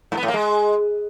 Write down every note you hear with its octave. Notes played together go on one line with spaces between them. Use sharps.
G#2
B3
A2
A#3
G#3